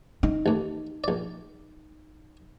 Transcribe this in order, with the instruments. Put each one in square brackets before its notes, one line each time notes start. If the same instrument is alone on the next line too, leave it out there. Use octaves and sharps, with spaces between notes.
[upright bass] D#4
[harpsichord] A1 D#2
A#1 D5